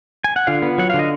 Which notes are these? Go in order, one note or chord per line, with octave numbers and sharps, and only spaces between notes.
G#5
F#5
D3 F4 F5
B3
F#3 F#5
D3 F5
D#5